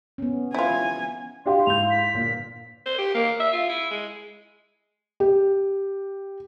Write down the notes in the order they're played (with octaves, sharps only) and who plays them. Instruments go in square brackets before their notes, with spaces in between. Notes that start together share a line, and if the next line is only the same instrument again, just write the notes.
[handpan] B3 C#4
[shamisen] E4 F4 [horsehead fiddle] G#5
[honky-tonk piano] D4 F#4 G4 [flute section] E4 F5 C6
[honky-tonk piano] G#2 G6 [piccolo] F7
[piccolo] B6
[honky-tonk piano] G1 A#2
[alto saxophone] C5
G4
A#3
E5
F4
E4
G#3
[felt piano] G4